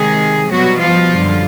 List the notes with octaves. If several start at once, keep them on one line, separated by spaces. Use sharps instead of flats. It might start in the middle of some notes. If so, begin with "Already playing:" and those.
Already playing: C3 D#3 G#3 G#4
B2 F#3 G3 B3 F#4
F3 F4
F#2 D3 G3